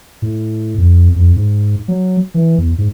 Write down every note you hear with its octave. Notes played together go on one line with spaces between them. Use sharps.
A2
F2
F2
G#2
F#3
E3
E2
G#2